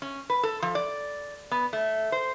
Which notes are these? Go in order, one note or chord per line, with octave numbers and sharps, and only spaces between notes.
C#4
B4
A4
F3
D5
B3
A3
C5